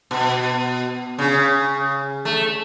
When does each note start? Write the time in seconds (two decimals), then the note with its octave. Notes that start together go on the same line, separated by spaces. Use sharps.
0.11 B2
1.18 C#3
2.25 A3